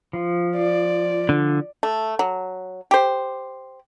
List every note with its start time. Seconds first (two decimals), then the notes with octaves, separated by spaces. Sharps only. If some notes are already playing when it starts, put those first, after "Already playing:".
0.13 F3
0.57 D5
1.29 D3
1.83 A3
2.19 F#3
2.91 G4 C5